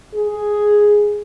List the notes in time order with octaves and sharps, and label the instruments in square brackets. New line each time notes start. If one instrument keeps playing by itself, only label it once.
[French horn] G#4